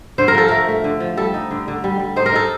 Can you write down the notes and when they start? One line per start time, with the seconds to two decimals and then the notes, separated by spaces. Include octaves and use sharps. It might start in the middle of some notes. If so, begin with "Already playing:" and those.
0.18 D3 C5
0.28 A#4
0.35 F3 A4
0.48 A3 A#4
0.68 A3
0.84 D3
1.00 F3
1.17 G3 A4
1.34 D#4
1.51 D3
1.68 D3
1.84 G3
2.00 G3
2.16 D#4 C5
2.26 A#4
2.34 D#4 A4